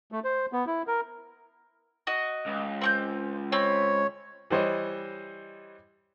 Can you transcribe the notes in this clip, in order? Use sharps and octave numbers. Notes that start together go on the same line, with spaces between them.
A3
C5
B3
E4
A#4
F#4 D#5
C#2
C4 C#6 G6
C4 C#5 B5
E3 G3 C5 C#5 D#5